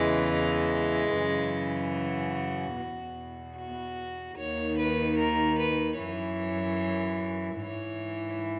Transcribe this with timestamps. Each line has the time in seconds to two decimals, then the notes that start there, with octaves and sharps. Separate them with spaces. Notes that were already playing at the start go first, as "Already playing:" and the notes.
Already playing: E2 C#3 E3 G#3
0.33 G#3
1.14 F#2 C#3 E3
1.95 F#4
2.76 E2 B2
3.57 F#4
4.37 D#2 D#3 C#5
4.78 B4
5.18 A#4
5.58 B4
5.99 F#2 E3 C#5
7.60 G#2 E3 C#5